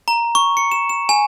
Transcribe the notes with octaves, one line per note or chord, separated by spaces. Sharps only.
A#5
C#6
C#7
E7
E7
G#5